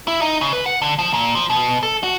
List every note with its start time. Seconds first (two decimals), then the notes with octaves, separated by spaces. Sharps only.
0.08 E4
0.22 D#4
0.41 C#3
0.53 B4
0.66 F#5
0.82 D3
0.99 F3
1.14 A#2
1.35 F3
1.50 B2
1.83 A4
2.03 F#4